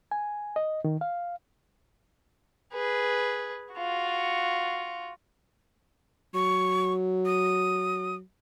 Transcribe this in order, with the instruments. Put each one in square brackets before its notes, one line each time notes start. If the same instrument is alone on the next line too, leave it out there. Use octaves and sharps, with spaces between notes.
[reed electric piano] G#5
D#5
D#3
F5
[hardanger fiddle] G#4 B4
F4 F#4
[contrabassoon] F#3 [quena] C#6
[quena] D#6